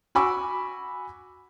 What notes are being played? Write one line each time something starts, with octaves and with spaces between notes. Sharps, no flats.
F#4 G#5 B5 C#6 D6 E6